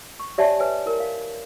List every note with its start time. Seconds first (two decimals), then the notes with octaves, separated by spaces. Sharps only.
0.20 C#6
0.38 G4 C#5 D5 E5 G#5 A5
0.60 B4 C#5 G#5
0.86 E4 A#4
1.00 F5